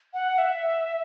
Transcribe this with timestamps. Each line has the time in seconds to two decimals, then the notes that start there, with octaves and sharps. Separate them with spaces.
0.13 F#5
0.38 E5